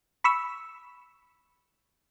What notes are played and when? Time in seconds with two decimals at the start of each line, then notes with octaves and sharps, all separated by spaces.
0.24 B5 C#6 E6